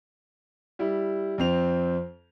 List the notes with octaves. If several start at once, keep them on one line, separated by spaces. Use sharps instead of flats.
G3 E4
F2 C4 F7